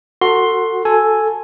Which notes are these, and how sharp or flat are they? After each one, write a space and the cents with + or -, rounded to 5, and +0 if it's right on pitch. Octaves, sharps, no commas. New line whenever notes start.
F#4 +0 A4 +35 C6 +10
A4 +0 G#5 +5